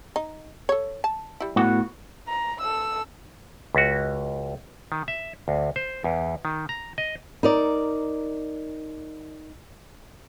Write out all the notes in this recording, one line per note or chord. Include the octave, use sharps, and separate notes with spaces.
D#4
A4 C#5
A5
G3 E4
A2 B3 F#4
A#5
A4 E6
C#2 F#4
D#3
E5
D2
C5
E2
D#3
A#5
D#5
D#4 A#4 D5